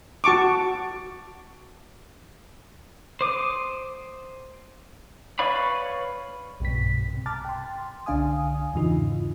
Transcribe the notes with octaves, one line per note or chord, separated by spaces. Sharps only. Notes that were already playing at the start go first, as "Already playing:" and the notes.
F#4 A5 C#6 D6
C5 D6 D#6
B4 C#5 D5 F5 B5
B1 G2 B2 B6
C3
A5 A#5 D6 F6 F#6 A6
G5 C6
C2 D3 D4 F5 G#5 D#6
E2 G#2 C#3 E3 D#4 F4